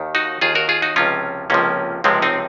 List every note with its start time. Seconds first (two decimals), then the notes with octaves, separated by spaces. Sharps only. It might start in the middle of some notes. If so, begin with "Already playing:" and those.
Already playing: D#2 D#3
0.15 D#4 F#4
0.41 D#2 D#3 F4 G#4
0.55 F#4 A#4
0.69 F4 G#4
0.82 D#4 F#4
0.96 C#2 C3 F3 C#4 F4
1.50 C#2 C3 F3 A#3 C#4
2.04 C#2 C3 F3 G#3 C4
2.22 C4 D#4